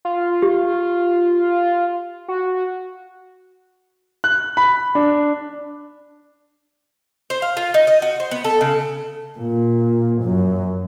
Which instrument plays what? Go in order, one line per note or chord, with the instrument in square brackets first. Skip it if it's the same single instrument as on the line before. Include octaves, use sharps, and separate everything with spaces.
[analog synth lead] F4
[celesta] G4
[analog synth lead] F#4
[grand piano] F#6
B5
D4
[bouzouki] C5
F5
F4
D#4
D#5
F#4
C5
B3
A4
C#3
[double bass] A#2
F#2